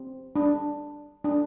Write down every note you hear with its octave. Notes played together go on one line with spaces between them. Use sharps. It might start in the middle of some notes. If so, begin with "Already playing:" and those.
Already playing: C4
D4
D4